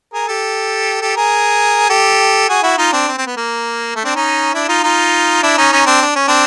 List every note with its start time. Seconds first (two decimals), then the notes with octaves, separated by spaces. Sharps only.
0.14 G#4 A#4
0.28 G4 A4
1.01 G4 A4
1.16 G#4 A#4
1.90 G4 A4
2.49 F#4 G#4
2.63 E4 F#4
2.78 D#4 F4
2.92 C4 D4
3.08 C4
3.18 C4
3.27 B3
3.37 A#3
3.96 A3
4.05 C4 D4
4.15 C#4 D#4
4.54 D4 E4
4.69 D#4 F4
4.83 D#4 F4
5.43 D4 E4
5.58 C#4 D#4
5.72 C#4 D#4
5.86 C4 D4
6.02 D4
6.15 C#4
6.28 C4 D4